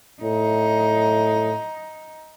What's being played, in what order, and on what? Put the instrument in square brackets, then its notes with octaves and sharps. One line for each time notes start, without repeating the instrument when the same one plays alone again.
[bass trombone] A2 [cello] D#4